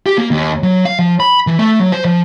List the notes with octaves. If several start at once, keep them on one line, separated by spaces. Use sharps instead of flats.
G4
A#3
D#2
F#3
F5
F3
B5
E3
A3
F#3
C5
F3